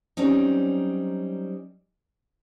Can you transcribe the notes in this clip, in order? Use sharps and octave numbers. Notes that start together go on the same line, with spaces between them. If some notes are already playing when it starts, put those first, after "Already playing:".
F#3 G3 C4 C#4 D#4